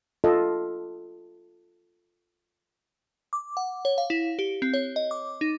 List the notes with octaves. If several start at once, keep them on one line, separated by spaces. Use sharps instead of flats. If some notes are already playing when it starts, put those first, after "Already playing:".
F4 A4 D#5
D6
F#5
C#5
F5
E4
G4
C4
C#5
D#5
D6
D#4